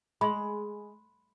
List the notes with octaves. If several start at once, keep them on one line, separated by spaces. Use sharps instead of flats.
G#3 B5 C6